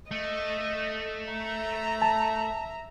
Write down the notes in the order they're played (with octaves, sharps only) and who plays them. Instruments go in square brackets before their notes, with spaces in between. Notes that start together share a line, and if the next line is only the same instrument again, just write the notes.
[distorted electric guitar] A3 [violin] D#5
[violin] E5 A#5
[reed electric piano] A5